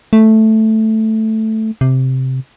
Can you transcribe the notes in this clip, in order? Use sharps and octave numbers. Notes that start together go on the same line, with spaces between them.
A3
C3